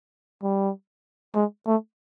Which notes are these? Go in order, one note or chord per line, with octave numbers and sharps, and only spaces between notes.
G3
G#3
A3